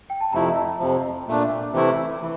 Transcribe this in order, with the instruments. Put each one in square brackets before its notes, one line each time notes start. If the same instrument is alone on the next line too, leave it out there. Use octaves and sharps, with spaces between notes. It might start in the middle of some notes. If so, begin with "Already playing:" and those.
[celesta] G5
A5
[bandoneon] F2 C3 F3 A3 E4 [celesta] A#5
[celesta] A5
[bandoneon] F2 C3 F3
A#2 A3 D4
C3 E3 A3 E4
E3